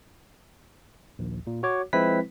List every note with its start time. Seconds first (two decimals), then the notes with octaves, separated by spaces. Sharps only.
1.19 A#1 D#2
1.47 A#2
1.63 F#4 C#5 D6
1.93 F3 G#3 C4 E4 B4 B6